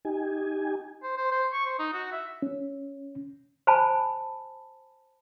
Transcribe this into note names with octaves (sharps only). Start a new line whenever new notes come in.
D#4 G4 G#5
C5
C5
C5
C#6
C5
D#4
F#4
E5
C#4
C5 G#5 A5 B5